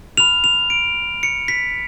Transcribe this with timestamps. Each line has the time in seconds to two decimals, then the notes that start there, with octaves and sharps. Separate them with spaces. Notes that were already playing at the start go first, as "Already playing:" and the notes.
0.17 B5 F6 F7
0.44 F7
0.70 D7
1.23 C#7
1.48 B6